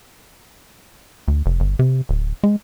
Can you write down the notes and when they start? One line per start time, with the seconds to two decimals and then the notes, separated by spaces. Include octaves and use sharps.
1.28 D2
1.46 F1
1.60 G1
1.79 C3
2.09 D1
2.44 G#3